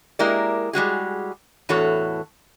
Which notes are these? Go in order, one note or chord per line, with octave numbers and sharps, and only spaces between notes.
G#3 A#3 E4 G4 A#4 D5
G3 G#3 F#4 G#4
E2 A2 F#4 A4 C#5